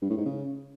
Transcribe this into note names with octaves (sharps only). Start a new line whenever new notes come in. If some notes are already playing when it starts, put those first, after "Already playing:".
G2
A2
G#2
C#3